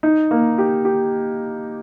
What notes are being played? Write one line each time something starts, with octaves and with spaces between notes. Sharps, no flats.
D#4
A#3
G4
G4